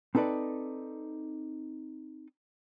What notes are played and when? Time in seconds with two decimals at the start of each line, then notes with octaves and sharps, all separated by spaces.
0.15 C4 D#4 A4 B4 D5